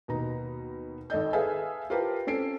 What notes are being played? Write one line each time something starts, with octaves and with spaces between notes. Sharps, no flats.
D#2 B2 D#4 A#5
G#1 A4 D#5 G6
G#4 A4 B4 E5 F5 G#5
F4 G4 A#4 B4 G5 A5
C4 C#4 A4 C7 D7